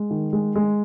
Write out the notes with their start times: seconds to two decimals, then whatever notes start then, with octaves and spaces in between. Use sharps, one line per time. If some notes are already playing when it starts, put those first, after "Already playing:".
Already playing: G#3
0.10 D#3
0.33 G#3
0.56 G#3